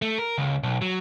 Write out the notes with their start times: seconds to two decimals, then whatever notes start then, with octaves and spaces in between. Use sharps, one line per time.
0.02 A3
0.18 A#4
0.38 C#2
0.63 B1
0.82 F#3